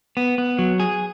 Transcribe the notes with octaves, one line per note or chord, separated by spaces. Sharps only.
B3
B3
F#3
G#4